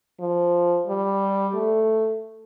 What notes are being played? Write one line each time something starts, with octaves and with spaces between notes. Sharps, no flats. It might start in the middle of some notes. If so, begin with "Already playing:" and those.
F3
G3
A3